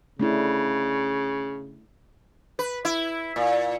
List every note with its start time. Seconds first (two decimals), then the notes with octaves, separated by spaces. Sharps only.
0.20 C#3 A3 D4 E4
2.59 B4
2.85 E4
3.36 A#2